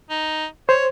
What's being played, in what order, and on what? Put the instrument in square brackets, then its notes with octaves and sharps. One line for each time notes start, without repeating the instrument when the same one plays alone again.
[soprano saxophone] D#4
[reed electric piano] C5 [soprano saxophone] C#5